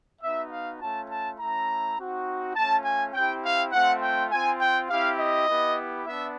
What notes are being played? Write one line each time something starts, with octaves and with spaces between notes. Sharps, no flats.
B3 D#4 F#4 E5
F5
A3 C#4 F4 A5
A5
A3 C#4 E4 A#5
C4 D#4 F#4
A3 C#4 F4 A5
G#5
C4 E4 G4 G5
F5
A3 C4 F4 F#5
G5
C4 F4 G#5
G5
C4 E4 G4 F5
D#5
B3 E4 G4
B3 D4 E5